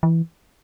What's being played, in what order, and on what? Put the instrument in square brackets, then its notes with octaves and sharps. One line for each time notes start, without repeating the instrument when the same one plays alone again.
[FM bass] E3